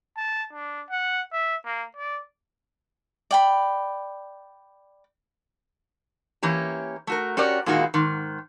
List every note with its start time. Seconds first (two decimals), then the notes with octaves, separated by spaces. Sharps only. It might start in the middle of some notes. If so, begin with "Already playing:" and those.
0.17 A5
0.53 D4
0.91 F#5
1.32 E5
1.65 A#3
1.97 D5
3.31 D5 G5 B5
6.42 E3 A#3 C#4 G4
7.07 A3 F#4 A#4
7.37 C#4 F#4 G4 A#4 D5
7.66 A#2 D#3 G#3 A#3 E4 F#4
7.94 G#2 D#3